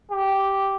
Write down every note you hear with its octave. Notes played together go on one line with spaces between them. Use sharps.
G4